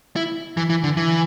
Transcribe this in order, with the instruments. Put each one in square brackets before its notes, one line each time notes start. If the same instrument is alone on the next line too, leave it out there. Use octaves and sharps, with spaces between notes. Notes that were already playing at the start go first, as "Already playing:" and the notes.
[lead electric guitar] E4
E3
E3
D3
E3